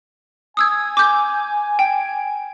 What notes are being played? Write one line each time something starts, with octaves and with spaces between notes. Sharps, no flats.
G#5 D#6 E6 G#6
D6 G6
G5